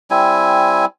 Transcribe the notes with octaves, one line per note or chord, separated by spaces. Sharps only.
G3 C4 E4 G#5